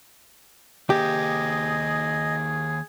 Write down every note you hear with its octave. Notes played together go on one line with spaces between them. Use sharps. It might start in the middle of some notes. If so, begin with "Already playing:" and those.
D#3 A#3 G4 G#4 C5 D#5